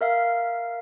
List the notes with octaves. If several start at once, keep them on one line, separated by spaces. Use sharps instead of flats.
A#4 E5 F5